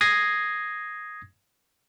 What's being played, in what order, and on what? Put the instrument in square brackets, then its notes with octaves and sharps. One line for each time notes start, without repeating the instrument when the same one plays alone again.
[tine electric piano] D#6 G#6 A#6 C7